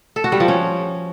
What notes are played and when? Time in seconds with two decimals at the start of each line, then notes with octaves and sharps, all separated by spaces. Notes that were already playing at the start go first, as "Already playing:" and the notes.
0.16 A4
0.24 F#4
0.32 G3
0.40 F3
0.48 C#4